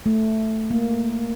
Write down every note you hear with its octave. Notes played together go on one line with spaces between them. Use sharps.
A3
A#3